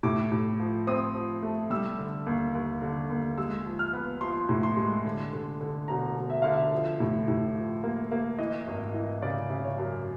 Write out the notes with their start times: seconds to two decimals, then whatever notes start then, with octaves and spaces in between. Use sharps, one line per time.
0.03 A2 D6
0.32 A2
0.60 F3
0.87 C4 D#6
1.15 F3
1.43 A3
1.70 G3 E6
1.98 D3
2.26 D#2
2.55 D#2
2.82 D3
3.10 D#2
3.38 G#3 E6
3.66 F3
3.79 F6
3.93 B3
4.21 F3 C6
4.49 A2
4.63 C6
4.77 G#3
5.05 D3
5.33 D3
5.60 D3
5.88 E1 A#5
6.16 E1
6.30 E5
6.42 D3 F5
6.53 E5
6.72 F3
7.00 A2
7.28 A2
7.55 F3
7.84 A#3
8.11 A#3
8.39 E3 D#5
8.67 G#1
8.94 E3
9.22 C#3 D5
9.50 C#3
9.64 C#5
9.78 F#2